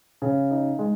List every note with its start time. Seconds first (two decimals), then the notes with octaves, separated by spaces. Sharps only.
0.22 C#3
0.51 D#4
0.79 G#3